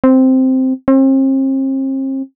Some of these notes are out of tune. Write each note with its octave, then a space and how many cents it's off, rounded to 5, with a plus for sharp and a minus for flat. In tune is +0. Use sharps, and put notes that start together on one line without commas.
C4 -5
C4 +40